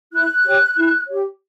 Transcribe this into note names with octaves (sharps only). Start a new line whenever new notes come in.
E4 F#6
G4 C#5
E4
G4 C#5